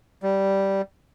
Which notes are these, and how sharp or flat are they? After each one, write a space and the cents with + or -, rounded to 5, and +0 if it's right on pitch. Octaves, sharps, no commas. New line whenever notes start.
G3 -10